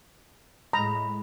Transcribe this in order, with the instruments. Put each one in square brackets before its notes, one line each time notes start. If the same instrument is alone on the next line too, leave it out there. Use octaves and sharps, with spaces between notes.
[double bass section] A2 G#3 [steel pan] A#5 [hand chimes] B5